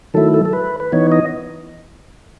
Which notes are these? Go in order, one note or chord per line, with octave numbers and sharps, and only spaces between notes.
D#3 F#3 A3 E4 A4
A4
A4
B4
B4
E3 B3 D#4 C#5
D#5